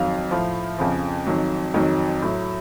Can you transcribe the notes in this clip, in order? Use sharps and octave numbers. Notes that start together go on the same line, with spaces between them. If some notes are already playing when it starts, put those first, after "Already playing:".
Already playing: F2 D#3 F#3 F5
A2 F3
F2 C#3 F3
F2 D#3 F#3
F2 D#3 F#3
A2 F#3